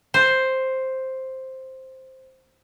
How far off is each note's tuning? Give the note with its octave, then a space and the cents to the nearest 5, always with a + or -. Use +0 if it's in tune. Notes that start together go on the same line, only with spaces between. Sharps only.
C5 +5